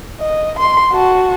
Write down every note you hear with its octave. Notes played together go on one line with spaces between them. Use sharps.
D#5
C6
F#4 A5